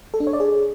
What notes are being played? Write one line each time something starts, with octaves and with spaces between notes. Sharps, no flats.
A4
D4
C#5
D5
G#4